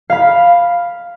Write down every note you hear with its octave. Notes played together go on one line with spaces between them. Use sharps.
F5 B5